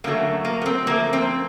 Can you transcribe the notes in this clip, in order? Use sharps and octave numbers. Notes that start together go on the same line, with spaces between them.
F#2 D3 F#3 A3 A#3
A#3
B3
C4
A#2 F3 A3 A#3
C4